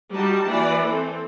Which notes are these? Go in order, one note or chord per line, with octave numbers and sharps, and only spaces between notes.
G3 D#4 F#4 G4 A5
E3 A#3 D5
C4 A4